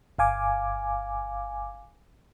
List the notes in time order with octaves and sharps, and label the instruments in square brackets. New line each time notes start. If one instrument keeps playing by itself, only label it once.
[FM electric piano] G1 F5 G#5 D6